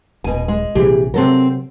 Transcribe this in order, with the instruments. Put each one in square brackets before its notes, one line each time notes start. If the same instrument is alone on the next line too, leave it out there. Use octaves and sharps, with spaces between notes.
[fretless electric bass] D#1 [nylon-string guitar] B2 G#5
[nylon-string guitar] G#3
[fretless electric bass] A#1 C3 E3 [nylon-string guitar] G4 G#4
[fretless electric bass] C3 F#3 [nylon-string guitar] C4 A4 A#4